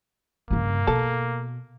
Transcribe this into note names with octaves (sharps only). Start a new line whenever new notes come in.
G2 C#3 A#3
B2 A4